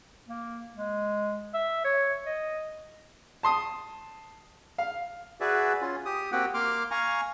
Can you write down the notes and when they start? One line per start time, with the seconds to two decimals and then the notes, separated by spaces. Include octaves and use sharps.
0.29 A#3
0.75 G#3
1.54 E5
1.85 C#5
2.25 D#5
3.43 A5 C6 D#6
4.78 F5
5.41 F#4 G#4 B4 D5 E5
5.81 C#4 F4
6.05 G4 D#6
6.32 A#3 C4 F#4 G4 F#5 G5
6.54 A#3 C6 D6 F6
6.91 F5 G#5 A#5 C#6